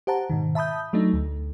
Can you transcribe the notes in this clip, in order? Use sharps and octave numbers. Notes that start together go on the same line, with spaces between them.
G4 C5 F#5 A5 A#5
G#2 B2 D#3
E5 A5 B5 D#6 G6
F#3 A3 D4 D#4
D2